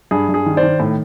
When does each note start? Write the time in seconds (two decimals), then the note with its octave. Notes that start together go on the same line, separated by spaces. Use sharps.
0.11 G2 G#4
0.29 G2
0.34 G#4
0.46 D#3
0.57 C5 D5
0.63 D#3
0.80 A2